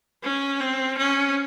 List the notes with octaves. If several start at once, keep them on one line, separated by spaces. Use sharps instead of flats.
C#4
C4
C#4